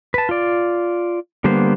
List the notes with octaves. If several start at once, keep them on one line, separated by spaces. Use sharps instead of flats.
B4 A5
F4 D5
D3 G3 A#3 B3 C5